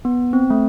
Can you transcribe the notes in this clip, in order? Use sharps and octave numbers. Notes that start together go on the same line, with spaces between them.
B3
C4
A3